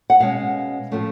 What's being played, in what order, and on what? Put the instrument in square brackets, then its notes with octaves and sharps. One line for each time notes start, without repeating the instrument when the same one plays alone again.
[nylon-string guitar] F#5
B2 G#3 C#4 F5
A2 F3 A3 C#4